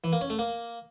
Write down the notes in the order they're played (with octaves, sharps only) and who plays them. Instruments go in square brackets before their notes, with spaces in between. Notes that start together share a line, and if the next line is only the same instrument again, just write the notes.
[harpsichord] E3
A#3
C#4
A3
A#3